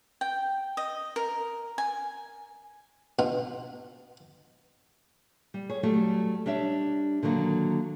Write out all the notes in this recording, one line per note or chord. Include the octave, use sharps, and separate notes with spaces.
G5
D#5
A#4
G#5
B2 F4
G3
G#4 C#5
F#3 G3 A3 G4
G3 D4 C#5 E5
D3 D#3 F#3 A#3